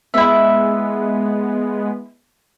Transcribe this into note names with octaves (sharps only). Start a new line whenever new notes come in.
G#3 B3 E4 E5